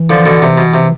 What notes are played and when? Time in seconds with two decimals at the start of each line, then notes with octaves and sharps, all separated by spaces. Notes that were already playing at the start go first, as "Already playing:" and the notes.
Already playing: E3
0.10 D3 F3
0.26 B2 D3
0.42 C3
0.58 B2
0.74 C3